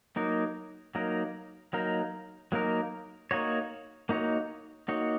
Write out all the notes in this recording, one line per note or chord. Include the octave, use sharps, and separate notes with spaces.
F#3 A#3 D#4 A#4
F#3 A#3 D#4 A#4
F#3 A#3 D#4 A#4
F#3 A#3 D#4 A#4
A#3 D#4 F#4 C#5
A#3 D#4 F#4 C#5
A#3 D#4 F#4 C#5